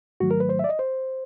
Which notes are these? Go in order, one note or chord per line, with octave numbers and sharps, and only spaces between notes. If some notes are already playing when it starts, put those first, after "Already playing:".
G#2 D#3 F#3 A3 F#4
A#4
B4
C5
E5
D5
D#5
C5